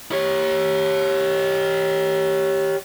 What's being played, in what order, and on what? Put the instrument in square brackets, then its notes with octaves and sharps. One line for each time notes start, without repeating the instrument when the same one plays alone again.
[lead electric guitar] G4 C#5